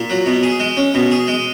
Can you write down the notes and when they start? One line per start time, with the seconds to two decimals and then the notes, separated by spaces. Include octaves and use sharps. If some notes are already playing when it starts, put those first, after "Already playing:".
Already playing: A#2
0.10 F#3
0.26 B2
0.43 G#4
0.60 G#3
0.77 C#4
0.94 B2
1.11 G#4
1.27 G#3